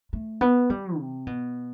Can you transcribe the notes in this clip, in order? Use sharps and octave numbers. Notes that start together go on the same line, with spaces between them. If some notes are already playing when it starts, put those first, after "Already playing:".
A3
B3
G3
C3
B2